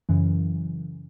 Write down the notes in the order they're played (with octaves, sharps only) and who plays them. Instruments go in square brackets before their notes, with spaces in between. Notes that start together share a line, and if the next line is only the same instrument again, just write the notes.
[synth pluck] F#2 C#3 E3